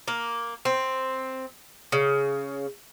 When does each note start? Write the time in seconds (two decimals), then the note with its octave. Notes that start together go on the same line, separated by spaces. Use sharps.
0.08 A#3
0.65 C4
1.92 C#3